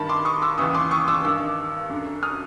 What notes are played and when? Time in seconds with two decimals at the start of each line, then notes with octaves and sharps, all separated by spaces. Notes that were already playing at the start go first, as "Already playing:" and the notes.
Already playing: G2 D#3 A5 B5
0.09 C6 D6
0.25 C#6 D#6
0.42 D6 E6
0.58 D#2 C#3 E3 C#6 D#6
0.74 C6 D6
0.91 C#6 D#6
1.08 D6 E6
1.25 G2 D#3 D6 E6
1.90 F#2 D3
2.23 D#6 F6